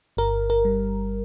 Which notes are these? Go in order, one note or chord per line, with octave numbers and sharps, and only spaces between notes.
G1 A#4
A#4
G3